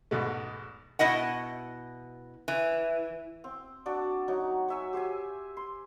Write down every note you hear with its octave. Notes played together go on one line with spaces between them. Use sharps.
E2 G#2 B2 A3
B2 E4 D#5 F#5
E3
C4
D4 F#4 D5
F#3 D#4
C#5 E5 G#5
G4 C5 E5 G#5
C6